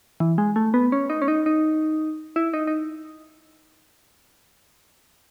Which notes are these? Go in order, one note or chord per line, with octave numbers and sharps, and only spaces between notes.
E3
G#3
A3
B3
C#4
D#4
C#4
D#4
D#4
E4
D#4
D#4